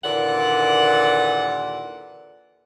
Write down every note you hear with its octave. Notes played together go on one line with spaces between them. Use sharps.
D#2 A#2 D3 E3 D5 F#5